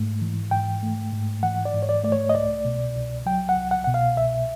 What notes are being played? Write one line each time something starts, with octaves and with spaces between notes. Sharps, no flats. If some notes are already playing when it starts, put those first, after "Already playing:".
Already playing: G#2 A3
E3
G#2 G5
A3
G#2
E3 F#5
D5
G#2
C#5
D5
A3 D5
C#5
D#5
C2 D5
B2
C2
F#3 G5
F#5
C2
F#5
B2 F#5
F5
C2 E5